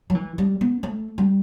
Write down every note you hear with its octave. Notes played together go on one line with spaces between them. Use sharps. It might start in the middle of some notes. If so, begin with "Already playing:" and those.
F#3
E3
G3
B3
A3
G3